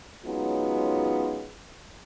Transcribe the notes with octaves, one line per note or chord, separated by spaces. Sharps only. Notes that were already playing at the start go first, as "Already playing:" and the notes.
F#3 G#3 B3 C#4 D#4 F4